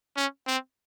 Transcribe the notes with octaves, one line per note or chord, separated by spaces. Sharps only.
C#4
C4